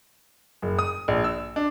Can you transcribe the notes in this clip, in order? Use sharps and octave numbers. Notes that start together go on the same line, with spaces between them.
F#1
D#6
A#1
E6
D4